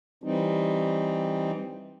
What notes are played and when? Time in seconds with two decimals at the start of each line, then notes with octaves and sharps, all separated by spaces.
0.24 E3 G3 C4 D#4